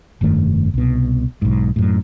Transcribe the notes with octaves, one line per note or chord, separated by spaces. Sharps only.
F1 G2 D#3 A3
C2 B2
B1 G#2
F#2 A2